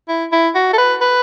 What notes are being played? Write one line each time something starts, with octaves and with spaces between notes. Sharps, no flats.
E4
E4
F#4
A4
B4
B4